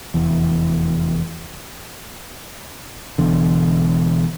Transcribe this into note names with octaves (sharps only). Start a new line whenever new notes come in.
F1 E2 E3
E1 E2 D3